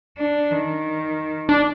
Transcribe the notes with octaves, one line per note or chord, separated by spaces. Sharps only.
D4
D#3
D4